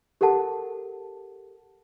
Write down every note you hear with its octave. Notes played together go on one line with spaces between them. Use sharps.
G4 A4 A#4 F#5 A5